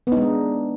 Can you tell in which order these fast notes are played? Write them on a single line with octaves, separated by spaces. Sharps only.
B3 D#4 G#3 D4